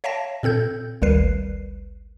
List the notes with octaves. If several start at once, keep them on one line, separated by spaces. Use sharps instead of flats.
C#5 E5 F5 G5 A5 A#6
A#2 C4 A4 G6
G#1 D2 G3 A#4 B4 C7